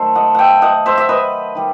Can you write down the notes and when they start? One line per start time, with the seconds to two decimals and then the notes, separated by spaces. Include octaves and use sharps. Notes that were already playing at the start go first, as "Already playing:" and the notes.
Already playing: D#3 F#3 A3 A4 C5
0.15 D#5 F#5
0.35 E5 F#5 G5
0.62 D#5 F#5
0.86 C5 E5
0.98 E5
1.09 B4 D#5
1.55 D#3 G3